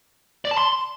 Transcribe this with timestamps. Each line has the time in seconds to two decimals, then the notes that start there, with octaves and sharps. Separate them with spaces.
0.45 D5
0.51 A5
0.58 C6